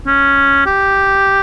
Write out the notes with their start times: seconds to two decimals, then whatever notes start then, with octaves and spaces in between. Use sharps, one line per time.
0.07 C#4
0.66 G4